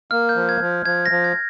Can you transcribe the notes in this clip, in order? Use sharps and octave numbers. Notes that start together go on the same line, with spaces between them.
A#3 F6
G6
F3
G#6
F3
F3 G#6
A#6
F3
G#6